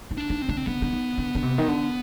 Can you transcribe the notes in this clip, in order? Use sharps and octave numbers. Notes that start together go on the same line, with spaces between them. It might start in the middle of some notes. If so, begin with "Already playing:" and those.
D#3
D4
D#3
C4
D3 D4
C4
D3 B3
D3
D#3
D3
D3
C3
D#3
D3